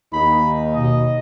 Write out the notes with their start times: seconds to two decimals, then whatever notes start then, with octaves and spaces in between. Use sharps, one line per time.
0.13 D#2 D#4 B5
0.74 B2 D#5